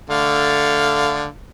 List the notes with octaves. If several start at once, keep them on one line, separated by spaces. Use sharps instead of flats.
D3 A3 F5